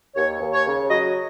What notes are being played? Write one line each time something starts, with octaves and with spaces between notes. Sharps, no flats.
D#2 C#5
D#2
C#5
C#3
F#3 D#5